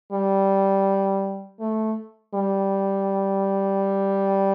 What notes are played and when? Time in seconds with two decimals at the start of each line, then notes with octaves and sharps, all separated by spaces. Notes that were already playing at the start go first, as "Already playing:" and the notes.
0.12 G3
1.60 A3
2.35 G3